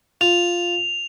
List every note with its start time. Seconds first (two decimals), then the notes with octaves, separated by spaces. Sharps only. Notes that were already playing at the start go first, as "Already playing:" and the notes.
0.21 F4 F7